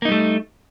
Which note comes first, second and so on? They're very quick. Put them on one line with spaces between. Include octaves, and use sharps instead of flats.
A#3 D#4 G3 A3